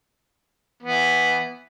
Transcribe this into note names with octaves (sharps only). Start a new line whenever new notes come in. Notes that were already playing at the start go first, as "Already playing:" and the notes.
E3 B3